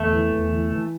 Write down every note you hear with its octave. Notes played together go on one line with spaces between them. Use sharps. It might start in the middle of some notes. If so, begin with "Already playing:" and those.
Already playing: E2 A3
E3
E2
E3
E3